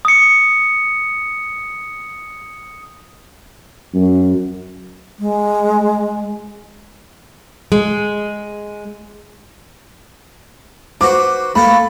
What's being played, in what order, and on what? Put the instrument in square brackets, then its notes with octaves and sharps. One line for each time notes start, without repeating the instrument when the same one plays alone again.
[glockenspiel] D#6 C#7
[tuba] F#2
[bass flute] G#3
[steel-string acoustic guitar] G#3
[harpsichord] F#4 B4 C5 [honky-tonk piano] D6
[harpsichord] A3 A#3 A4 [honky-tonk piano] B5